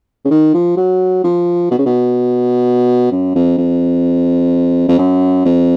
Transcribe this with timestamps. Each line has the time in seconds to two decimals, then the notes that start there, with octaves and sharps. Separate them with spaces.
0.25 C#3
0.30 D#3
0.54 F3
0.77 F#3
1.24 F3
1.71 B2
1.79 C#3
1.86 B2
3.11 F#2
3.35 F2
3.58 F2
4.89 F2
4.99 F#2
5.45 F2